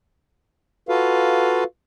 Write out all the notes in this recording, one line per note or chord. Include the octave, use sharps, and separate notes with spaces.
F4 F#4 A4 B4 F5